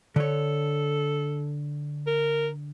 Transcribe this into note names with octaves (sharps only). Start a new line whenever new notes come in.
D3 A4 C#5
A#4